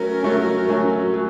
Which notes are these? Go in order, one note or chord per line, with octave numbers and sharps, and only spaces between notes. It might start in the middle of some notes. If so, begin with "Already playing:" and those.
Already playing: F#3 A3 C#4 A#4
F#3 A3 C#4
F#3 A3 C#4
F#3